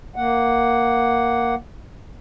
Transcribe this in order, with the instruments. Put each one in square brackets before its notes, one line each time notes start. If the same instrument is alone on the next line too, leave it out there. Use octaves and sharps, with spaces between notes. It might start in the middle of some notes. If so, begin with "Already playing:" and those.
[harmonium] A#3 F#5